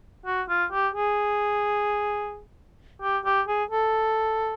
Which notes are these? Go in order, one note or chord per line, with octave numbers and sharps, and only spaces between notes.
F#4
F4
G4
G#4
G4
G4
G#4
A4